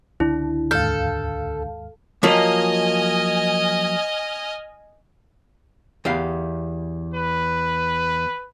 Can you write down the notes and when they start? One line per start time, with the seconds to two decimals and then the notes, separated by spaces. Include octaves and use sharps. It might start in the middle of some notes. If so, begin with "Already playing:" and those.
0.20 C#2 D3 D4 E4
0.71 D#2 G#2 A4 F5 F6 G6
2.23 F3 F#3 A#3 D#5 G#5 F6
6.05 E2 G4 F5
7.14 B4